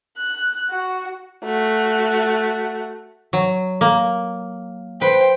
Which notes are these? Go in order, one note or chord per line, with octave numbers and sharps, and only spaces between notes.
F#6
F#4
A3 F#4
F#3
A#3
B4 C5 G5